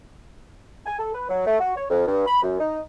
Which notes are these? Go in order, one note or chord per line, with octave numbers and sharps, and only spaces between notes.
G#5
A4
B4
F#3
A3
F#4
C#5
F2
G2
B5
F#2
D#4